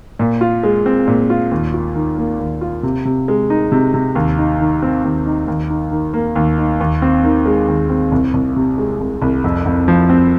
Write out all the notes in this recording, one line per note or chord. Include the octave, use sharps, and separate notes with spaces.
A#2
F4
G#3
C4
A#2
F4
D#2
F4
D#3
A#3
D#2
F4
C3
C3
G#3
D#4
C3
C3
D#2
D#4
D#3
C4
D#2
D#4
D#2
D#4
D#3
A#3
D#2
D#4
D#2
C4
D#3
G#3
D#2
C4
C2
C2
C3
G#3
C2
C2
F2
F2
F3
C4